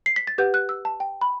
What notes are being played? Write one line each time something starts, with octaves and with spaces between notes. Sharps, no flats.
C7
B6
A6
G4 B4 F#5 G6
F#6
E6
A5
G5
B5